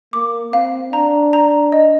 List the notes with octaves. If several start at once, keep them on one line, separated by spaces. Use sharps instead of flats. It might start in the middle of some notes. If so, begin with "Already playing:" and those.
A#3 D6
C4 F5
D4 A#5
A#5
D#5